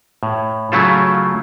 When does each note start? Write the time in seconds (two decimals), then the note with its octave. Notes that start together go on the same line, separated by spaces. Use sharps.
0.23 A2
0.72 C#3 F#3 A3 E4 F4 A4